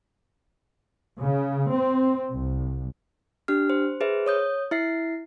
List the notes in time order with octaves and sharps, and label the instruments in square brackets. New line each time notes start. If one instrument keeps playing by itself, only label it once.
[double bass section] C#3
C4
C2
[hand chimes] D4 G4 F6
C5
G#4 B4 C5 E5
C#5 D#6 G6
E4 E5 C7